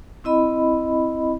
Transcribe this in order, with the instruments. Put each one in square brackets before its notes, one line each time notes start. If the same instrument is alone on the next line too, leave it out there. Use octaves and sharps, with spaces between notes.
[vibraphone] C4 E4 D#5 B5